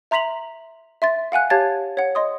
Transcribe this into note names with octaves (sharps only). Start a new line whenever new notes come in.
E5 A#5 C6 B6 F7 F#7
E5 C6 A6
F5 F#5 G#5 F#6
G4 C#5 F5 A5 G#6 A6
C#5 F#5
D#5 C6 D#6